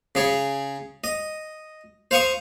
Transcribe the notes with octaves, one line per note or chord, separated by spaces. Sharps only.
C#3 G#4 C#5
D#5
C5 F5 C#6 D#6